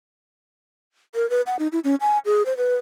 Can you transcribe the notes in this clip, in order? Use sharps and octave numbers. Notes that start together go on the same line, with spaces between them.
A#4
B4
F#5
D#4
E4
C#4
G#5
G#4
C5
B4